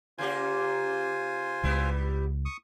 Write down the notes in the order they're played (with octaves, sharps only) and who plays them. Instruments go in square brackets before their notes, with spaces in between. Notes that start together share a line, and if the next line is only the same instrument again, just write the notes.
[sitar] C#3 A#3 G4 [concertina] F4 C5 G#5
[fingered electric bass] C#2 C#3 [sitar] G3 B3 E4
[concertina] C#6 D#6